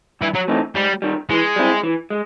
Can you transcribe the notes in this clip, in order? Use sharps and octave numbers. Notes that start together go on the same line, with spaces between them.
G2 E3
F#3
E3 A3 C4 D#4
G#2 G3
D#3 G3
E3 G#3
G3 C4 E4
E3
G#3